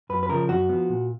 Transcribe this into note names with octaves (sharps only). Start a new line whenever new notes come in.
F#2 B4
B4
C#3 F3 A#4
F#2 F#4
F3 B3
A#2